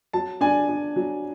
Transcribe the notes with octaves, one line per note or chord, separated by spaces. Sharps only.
F#3 A5
D4 G#5
D4
F#3